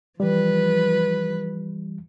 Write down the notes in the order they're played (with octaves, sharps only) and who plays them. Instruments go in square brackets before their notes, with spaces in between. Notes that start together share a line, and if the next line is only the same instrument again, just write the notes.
[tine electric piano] E3 G3 [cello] F3 B4